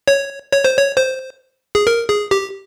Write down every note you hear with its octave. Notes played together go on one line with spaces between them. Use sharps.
C#5
C#5
C5
C#5
C5
G#4
A#4
G#4
G4